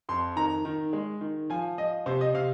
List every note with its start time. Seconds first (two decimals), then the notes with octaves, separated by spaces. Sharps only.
0.09 F2 C6
0.36 D#3 A#5
0.65 D#3
0.93 G#3
1.21 D#3
1.50 F3 G#5
1.78 F3 D#5
2.06 C3 C5
2.21 D#5
2.34 C3 F5